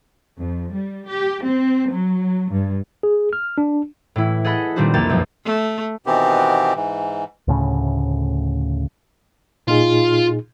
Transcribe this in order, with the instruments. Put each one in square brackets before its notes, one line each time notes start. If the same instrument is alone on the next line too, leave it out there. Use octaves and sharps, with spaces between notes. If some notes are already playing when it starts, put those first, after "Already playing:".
[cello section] F2
G3
G4
C4
F#3
G2
[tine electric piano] G#4
F6
D4
[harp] A2 E3 E4
G#4 A4 D#5 F#5 B5
A#2 D#3 G3 C4 D4 F#4
C2 F2 A#3 G4 G5 A6
F#2 B2 F3 G#3
[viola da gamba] A3
[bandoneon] B2 D#3 E3 B3 C4 G4
G#2 E3
[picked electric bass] D2 A2 C#3
[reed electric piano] A#2 D#4 G#4 [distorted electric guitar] F4